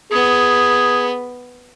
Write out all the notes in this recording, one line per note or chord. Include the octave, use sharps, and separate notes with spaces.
B3 G#4